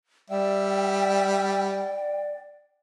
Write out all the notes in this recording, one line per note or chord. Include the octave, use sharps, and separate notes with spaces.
G3 D5 E5 G5